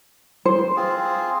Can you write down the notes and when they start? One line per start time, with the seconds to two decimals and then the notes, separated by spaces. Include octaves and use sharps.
0.45 C5
0.76 C4 F4 G#4